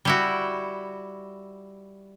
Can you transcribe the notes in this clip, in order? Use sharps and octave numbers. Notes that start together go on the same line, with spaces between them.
G3 E4 F#4